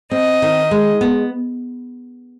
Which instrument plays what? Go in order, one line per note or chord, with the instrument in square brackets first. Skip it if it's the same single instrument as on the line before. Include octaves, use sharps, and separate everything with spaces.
[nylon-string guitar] C4 [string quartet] D#5
[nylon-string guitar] D#3
G#3
B3